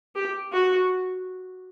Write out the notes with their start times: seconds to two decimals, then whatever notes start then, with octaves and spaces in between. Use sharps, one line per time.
0.16 G4
0.52 F#4